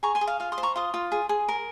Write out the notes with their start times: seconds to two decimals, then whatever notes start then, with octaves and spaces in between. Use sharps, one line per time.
0.03 G#4 A#5 C#6
0.15 G#5 C6
0.21 G#4
0.27 F5
0.40 F4 F5
0.52 C6 D#6
0.58 C5
0.63 A#5 C#6
0.76 F4 C6 D#6
0.94 F4
1.12 G#4
1.29 G#4
1.49 A#4